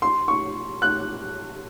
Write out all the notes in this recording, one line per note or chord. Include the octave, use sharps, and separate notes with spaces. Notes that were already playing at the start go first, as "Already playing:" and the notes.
C6
C#6
F#6